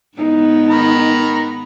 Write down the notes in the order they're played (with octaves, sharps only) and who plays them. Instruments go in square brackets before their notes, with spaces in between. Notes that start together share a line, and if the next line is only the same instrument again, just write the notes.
[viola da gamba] G#2 B3 [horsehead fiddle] D#4
[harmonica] D#3 A#5 B5